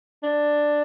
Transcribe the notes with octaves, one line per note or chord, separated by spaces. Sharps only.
D4